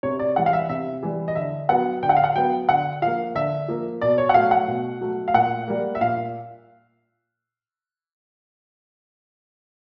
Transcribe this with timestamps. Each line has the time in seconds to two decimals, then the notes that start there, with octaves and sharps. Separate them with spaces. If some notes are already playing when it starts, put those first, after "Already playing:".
0.03 C3 C#5
0.19 D5
0.36 E3 G3 F#5
0.46 F5
0.53 E5
0.69 C3 E5
1.03 E3 G3
1.28 D#5
1.35 D3 E5
1.69 F#3 B3 F#5
2.03 D3 G5
2.09 F#5
2.17 F5
2.24 F#5
2.35 F#3 B3 G5
2.69 D3 F#5
3.02 F3 A#3 F5
3.35 D3 E5
3.68 F3 A#3
4.01 B2 D5
4.18 C#5
4.29 F#5
4.34 F#3 A3 F5
4.51 F#5
4.68 B2
5.01 F#3 A3
5.28 F5
5.34 A#2 F#5
5.68 G3 A#3
5.95 E5
6.01 A#2 F5